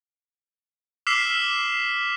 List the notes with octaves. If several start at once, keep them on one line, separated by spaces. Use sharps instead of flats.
D6 E6 F6 B6 C7 E7